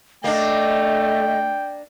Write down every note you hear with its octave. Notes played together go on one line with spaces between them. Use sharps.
A3 A#3 D4 D#5 G5